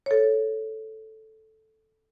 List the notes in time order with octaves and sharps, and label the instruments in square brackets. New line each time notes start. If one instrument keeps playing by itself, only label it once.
[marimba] A4 C#5